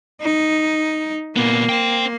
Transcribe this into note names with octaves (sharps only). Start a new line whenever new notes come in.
D#4
A#2 A#3 B3
C5 G5